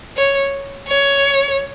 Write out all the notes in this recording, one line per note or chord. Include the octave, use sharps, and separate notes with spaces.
C#5
C#5